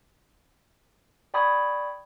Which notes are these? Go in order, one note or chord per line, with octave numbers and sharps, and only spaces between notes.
D5 G5 B5 C#6 D#6 G#6